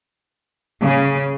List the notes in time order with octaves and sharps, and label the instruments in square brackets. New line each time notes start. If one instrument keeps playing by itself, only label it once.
[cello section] C#3